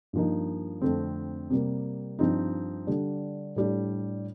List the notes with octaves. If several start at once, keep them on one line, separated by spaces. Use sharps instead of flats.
G2 F3 A#3 D#4
F2 D3 A3 C4
C3 G3 A#3
G2 F3 C4 D#4
D3 G3 D4
A2 G3 D4